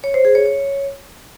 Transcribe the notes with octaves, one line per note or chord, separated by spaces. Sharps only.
C#5
C5
G#4
C#5
C#5